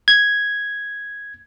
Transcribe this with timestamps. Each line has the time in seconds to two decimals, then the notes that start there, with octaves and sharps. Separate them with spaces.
0.08 G#6